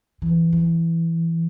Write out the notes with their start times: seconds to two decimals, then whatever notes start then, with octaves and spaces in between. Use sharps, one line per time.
0.22 E3
0.52 E3